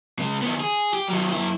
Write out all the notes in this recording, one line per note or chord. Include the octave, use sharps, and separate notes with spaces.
C#3 G#3
D#3 B3
G#4
G4
D#3 F#3
F#2 E4